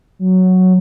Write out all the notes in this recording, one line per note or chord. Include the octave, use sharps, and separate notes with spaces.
F#3